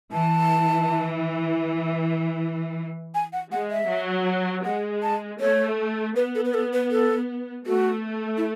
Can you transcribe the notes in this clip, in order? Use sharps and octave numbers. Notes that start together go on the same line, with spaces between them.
E3 A5
G#5
F#5
G#3 F#5
E5
F#3
G#3 F#5
A5
A3 C#5
B3 B4
A4
B4
A4
B4
A4
A3 F#4
E4